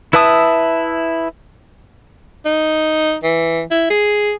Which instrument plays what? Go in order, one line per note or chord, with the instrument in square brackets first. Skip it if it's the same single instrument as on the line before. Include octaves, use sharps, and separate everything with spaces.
[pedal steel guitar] E4 B4 E5 A5 D#6
[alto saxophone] D#4
E3
E4
G#4